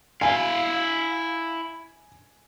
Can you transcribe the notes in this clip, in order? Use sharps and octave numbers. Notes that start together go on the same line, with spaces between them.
E4 F5 G#5